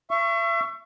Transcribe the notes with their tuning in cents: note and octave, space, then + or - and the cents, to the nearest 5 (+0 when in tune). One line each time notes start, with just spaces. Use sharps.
E5 +40 C#6 +0